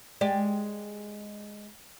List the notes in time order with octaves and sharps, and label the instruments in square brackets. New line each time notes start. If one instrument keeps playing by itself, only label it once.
[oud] G#3 G4 D5